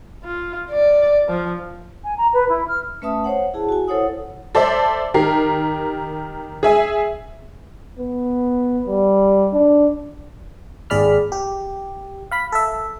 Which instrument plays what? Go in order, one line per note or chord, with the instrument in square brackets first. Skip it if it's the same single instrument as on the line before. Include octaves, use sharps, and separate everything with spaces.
[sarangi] F4
D5
F3
[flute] G#5
A#5
B4
E4
F6
[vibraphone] A3 C#4 B4 E5 A5 D#6
C5 C#5 F#5
E4 G#4 A5
F#4 G#5
E4 A4 C5 C#5 F#5 D#6
[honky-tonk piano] A4 C5 D5 E5
D#3 G4 A#4 C7
G#4 E5 G#5
[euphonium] B3
G3
D4
[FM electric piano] G#1 D#2 G#4 D5 B5 F6
G4
F5 B5 B6
A4 E5